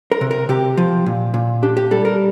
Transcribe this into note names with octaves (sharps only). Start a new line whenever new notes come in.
A#4
C3
A#4
C3 G4
F3
A#2
A#2
D4 G4
G4
G3 A4
A#4